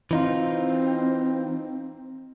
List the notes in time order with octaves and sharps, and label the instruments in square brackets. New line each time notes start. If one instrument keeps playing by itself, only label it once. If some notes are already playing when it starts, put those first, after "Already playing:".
[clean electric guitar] E3 D#4 F4 [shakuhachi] C4